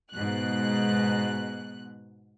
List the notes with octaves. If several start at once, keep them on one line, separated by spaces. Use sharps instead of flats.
G#2 B2 F#6